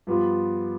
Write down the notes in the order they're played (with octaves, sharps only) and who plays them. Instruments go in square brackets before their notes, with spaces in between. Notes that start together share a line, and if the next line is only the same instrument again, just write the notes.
[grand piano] G2 F3 B3 F4